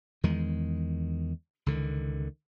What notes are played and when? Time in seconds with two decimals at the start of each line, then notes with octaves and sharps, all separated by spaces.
0.23 E2 D#3 G#3
1.66 C#2 D3 D#3